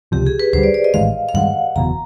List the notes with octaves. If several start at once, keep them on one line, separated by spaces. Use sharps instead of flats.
C#2 C3 F3 G4
G#4
B4
D2 D3 G3 C5
D5
D5
D#5
A1 G#2 D#3 G#3 F5
F5
G2 D#3 G#3 F#5
F#1 E2 B2 A#5